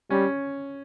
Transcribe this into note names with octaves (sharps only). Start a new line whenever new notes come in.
G3 C#4